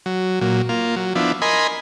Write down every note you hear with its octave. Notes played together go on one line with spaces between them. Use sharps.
F#3
A#2 F#3
A#3 F4
F#3
F3 B3 D4 E4
A#4 D#5 G#5 B5 C6